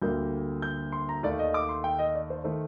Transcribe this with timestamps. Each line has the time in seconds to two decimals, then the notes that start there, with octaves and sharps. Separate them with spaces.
0.02 D2 D3 G3 A#3 G6
0.62 G6
0.92 C6
1.09 A#5
1.23 D#2 D#3 A3 D5
1.39 D#5
1.54 D6
1.69 C6
1.84 G5
1.99 D#5
2.15 D5
2.30 C5
2.44 D#3 A3 C5